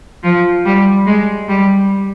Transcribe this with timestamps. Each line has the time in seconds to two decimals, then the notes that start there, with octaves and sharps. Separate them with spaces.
0.24 F3
0.66 G3
1.07 G#3
1.49 G3